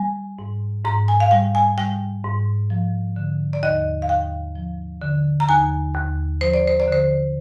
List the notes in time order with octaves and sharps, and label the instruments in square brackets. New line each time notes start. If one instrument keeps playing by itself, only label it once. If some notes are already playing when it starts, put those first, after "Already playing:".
Already playing: [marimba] G3 G#5
G#2
G#2 A#5
G#5
F5
G3 G5
G#5
G3 G5
G#2
F3
D3
D5
D#2 D#5
F5
D#2 G5
F3
D3
A#5
D#2 G#5
D#2
F3 C5
D5
C5
D5
D3 C5